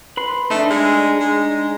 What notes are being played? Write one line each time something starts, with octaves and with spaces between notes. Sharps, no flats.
B4 B5 C6
A3 D4 D#4
G#3
G#3